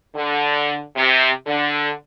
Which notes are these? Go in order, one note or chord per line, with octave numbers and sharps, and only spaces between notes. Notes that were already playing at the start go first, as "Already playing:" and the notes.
D3
C3
D3